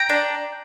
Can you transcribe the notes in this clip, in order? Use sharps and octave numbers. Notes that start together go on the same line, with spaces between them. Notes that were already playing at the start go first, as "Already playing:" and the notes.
Already playing: G5 A#5
D4